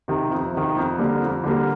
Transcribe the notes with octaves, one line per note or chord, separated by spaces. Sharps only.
C3 D#3
F2
C3 D#3
F2
D3 G3 A#3
F2
D3 G3 A#3